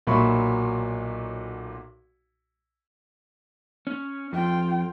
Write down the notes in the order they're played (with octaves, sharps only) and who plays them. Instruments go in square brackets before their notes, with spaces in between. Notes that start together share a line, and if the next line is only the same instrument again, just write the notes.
[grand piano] B1 A#2 F#3 E5 B5 C#6
[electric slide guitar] C#4
[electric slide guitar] F2 [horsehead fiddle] F4 G5